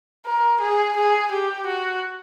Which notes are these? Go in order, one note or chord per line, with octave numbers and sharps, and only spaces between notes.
A#4
G#4
G#4
G4
F#4